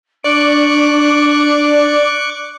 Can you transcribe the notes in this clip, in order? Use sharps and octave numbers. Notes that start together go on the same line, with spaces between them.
D4 D5 C#6 D6 F#6